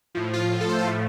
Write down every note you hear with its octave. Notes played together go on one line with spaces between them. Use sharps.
A2 F3
F4
A2 F3
A4
C5
A4
A2 F3 A3